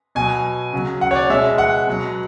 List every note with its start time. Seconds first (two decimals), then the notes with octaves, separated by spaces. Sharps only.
0.15 B2 F#3 G#5
0.73 C#3 F#3
1.01 F#5
1.11 C#5
1.16 D5
1.30 B2 G#3 E5
1.58 F#5
1.87 B2 F#3